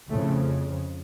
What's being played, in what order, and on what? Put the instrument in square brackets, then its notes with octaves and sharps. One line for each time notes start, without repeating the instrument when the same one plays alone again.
[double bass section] F2 A2 C#3 A3